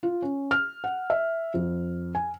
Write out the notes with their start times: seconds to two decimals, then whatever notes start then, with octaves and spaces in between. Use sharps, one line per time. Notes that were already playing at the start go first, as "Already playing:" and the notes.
0.03 F4
0.22 C#4
0.51 F6
0.84 F#5
1.10 E5
1.54 F2
2.15 G#5